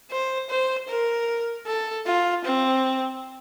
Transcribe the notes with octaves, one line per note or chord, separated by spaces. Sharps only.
C5
C5
A#4
A4
F4
C4